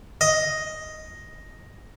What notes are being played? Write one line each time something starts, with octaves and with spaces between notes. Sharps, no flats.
D#5